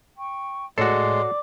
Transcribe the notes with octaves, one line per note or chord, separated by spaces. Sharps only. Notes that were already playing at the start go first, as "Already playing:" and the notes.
G5 C#6
A2 G#3 F#4 A4 C#5 D5 D6 C7